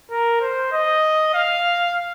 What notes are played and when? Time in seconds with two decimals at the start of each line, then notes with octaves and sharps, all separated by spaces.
0.11 A#4
0.41 C5
0.72 D#5
1.34 F5